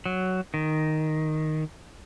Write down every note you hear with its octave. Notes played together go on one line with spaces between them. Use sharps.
F#3
D#3